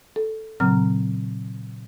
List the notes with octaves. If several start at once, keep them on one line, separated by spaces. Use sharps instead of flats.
A4
A#2 C#3 F#3 C4 A#5 F6